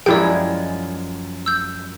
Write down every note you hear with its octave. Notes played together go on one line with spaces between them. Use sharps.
F#2 F3 G#3 E4 G4 D5 G5
E6 G6